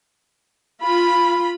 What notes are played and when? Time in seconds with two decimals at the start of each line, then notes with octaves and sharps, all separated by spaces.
0.82 F4 B5